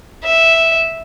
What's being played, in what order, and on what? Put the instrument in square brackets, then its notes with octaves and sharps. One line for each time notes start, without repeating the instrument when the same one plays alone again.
[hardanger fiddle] E5